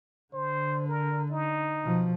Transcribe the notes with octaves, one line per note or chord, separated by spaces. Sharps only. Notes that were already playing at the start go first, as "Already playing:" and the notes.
D3 C5
A#4
D#4
B2 F3